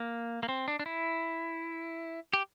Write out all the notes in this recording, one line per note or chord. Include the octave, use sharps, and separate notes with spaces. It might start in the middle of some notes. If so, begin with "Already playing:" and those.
Already playing: A#3
A#3
C4
D4
D4
E4
G4